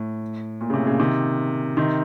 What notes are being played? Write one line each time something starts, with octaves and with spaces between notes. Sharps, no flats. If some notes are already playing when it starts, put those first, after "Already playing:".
Already playing: A2
A#2
C#3
A2 C3
A#2 C#3
C3 D#3
C3 D#3